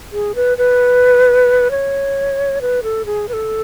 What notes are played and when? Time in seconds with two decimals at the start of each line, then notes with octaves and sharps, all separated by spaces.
0.13 G#4
0.35 B4
0.58 B4
1.71 C#5
2.61 B4
2.83 A4
3.06 G#4
3.29 B4
3.33 A4